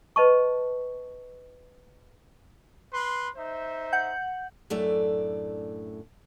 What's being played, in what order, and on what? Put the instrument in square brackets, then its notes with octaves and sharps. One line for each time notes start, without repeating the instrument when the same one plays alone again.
[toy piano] B4 D#5 A5 C#6
[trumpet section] B4 C6
D#4 C5 E5
[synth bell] F#5 G6
[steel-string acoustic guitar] F#2 A2 A3 D4 D5